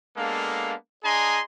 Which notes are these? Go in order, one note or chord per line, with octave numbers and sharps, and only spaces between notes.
G#3 A#3 B3 D4 A4 F5
D4 G#4 D#5 G#5 A#5 C6